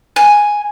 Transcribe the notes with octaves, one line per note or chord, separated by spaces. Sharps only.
G#5